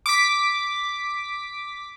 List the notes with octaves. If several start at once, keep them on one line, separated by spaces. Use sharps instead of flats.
D6 B6